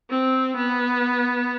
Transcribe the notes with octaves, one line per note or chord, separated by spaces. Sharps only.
C4
B3